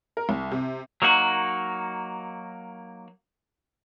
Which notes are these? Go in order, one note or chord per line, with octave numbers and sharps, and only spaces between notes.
A#4
C2
C3
F#3 A#3 D#4 F#4